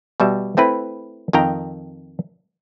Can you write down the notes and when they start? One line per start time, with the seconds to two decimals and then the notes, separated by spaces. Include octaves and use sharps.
0.20 B2 G3 E5
0.57 A3 C4 E4 B4
1.33 F2 D#3 G5 A#5